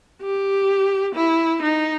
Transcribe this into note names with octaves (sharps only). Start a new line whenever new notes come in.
G4
E4
D#4